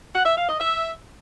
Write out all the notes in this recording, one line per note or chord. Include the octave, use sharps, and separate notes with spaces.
F#5
E5
F5
D#5
E5